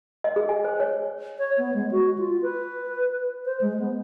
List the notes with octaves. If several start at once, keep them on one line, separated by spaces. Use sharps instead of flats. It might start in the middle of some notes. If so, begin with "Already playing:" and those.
D#5
G#4
G#5
C5
C#5
C#5
B3
G#3
F#4
F4
B4
C5
G#3
B3